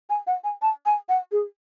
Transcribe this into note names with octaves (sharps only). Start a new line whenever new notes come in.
G#5
F#5
G#5
A5
G#5
F#5
G#4